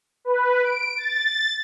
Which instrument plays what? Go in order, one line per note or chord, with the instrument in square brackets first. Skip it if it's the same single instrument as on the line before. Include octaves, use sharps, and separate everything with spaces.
[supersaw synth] B4
D7
A6